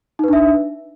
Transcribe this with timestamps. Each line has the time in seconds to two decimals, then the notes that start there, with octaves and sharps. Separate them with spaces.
0.19 D#4
0.24 B4
0.28 D4
0.33 E5